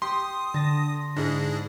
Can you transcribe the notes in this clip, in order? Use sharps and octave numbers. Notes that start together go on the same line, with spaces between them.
G4 C6 D#6
D3 A5 A#6
G#2 D4 E4 G#4